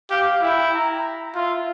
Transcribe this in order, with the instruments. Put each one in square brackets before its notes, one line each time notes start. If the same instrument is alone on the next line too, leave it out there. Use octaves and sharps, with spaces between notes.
[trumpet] G4 [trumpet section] F5
[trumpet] E4 [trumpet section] G5
[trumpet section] A#5
[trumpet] F4 [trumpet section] E5